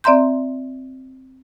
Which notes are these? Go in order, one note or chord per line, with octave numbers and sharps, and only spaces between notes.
C4 D5 E5 A#5 C6 G6